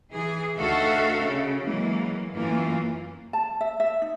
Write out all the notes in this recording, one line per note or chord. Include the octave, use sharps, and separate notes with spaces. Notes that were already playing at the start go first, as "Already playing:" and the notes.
E3 G#4
D2 D#4 F#4 A4 E5 F5
C#3
E3 F#3 G#3 A#3
F#2 E3 A3 A#3 F4
A5
E5
E5
D#4